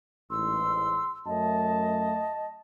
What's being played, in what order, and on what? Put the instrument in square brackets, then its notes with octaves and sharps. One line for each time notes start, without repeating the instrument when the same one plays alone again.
[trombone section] A1 G#2 [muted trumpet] C6 [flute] E6
[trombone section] F#2 A3 [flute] D#5 [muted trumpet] A5